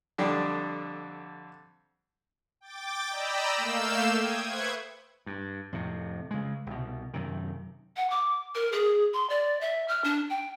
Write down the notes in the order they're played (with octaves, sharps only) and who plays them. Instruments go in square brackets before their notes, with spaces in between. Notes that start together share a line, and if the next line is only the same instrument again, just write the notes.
[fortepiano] F2 D3 G3 D4 G5
[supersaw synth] G5 D6 A6
D5 D#5 G5 A#5 B5 E6
A3 A#3 F5 E6 G6 E7
G5 D#6 G#6
B4 C5 E5 C#6 F#6 G#6
[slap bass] G2
F2 A2 C3
C#3 G#3
C2 B2
F#2 C3 D#3
[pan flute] F#5
D6
A#4
G#4
C6
D5
E5
F6
D4
G5